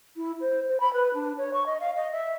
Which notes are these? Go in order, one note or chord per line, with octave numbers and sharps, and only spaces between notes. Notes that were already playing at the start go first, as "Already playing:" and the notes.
E4
C5
C5
B5
B4
D4
C#5
C#6
D#5
F5
D#5
E5